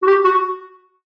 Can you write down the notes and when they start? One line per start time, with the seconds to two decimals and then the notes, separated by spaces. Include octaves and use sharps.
0.02 F#4
0.07 G4
0.24 F#4